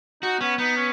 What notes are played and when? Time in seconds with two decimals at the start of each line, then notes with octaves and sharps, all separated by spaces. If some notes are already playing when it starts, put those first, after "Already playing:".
0.22 D#4 F#4
0.40 B3 C#4
0.58 B3 D#4
0.77 C#4